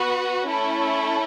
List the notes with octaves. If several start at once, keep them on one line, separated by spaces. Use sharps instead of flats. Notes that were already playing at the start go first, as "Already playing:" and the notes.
Already playing: B3 F#4 B4
A3 C#4 E4 A4